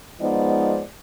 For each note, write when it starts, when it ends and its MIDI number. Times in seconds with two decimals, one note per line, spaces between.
0.20 0.81 53
0.20 0.81 56
0.20 0.81 59
0.20 0.81 63
0.20 0.81 72
0.20 0.81 74